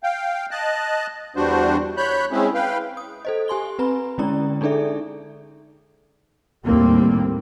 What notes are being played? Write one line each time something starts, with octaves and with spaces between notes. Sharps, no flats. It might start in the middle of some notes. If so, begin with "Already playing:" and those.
F5 G5
D#5 A5 F#6
E2 G3 D4 F#4 C5
C#5 B5 F#6 G6
G#3 C4 C#4 E4 G#4
B4 F5 G5
D#6
A4 C5 D#5
G4 G#5 C6 G7
C4 B4 A#5 B5
D3 G#3 C#4 E4 D5 A#5
D4 D#4 G#4 A4 D5 E5
D#2 A2 G3 A#3 C4